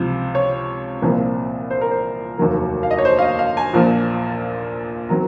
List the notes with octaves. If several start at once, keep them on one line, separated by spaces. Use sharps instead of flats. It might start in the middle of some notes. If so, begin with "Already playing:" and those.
Already playing: C#2 C3 F3
C#5
C2 A#2 F3 C4
C5
A#4
C5
F1 D#2 D#3 F#3 A#3
F5
D#5
C#5
C5
F5
D#5
F5
G#5
A#1 A#2 F3
D#3 F#3 C4 A#5